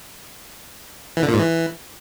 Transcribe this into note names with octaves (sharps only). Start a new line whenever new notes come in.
E3
D3
A#2
G#2
E3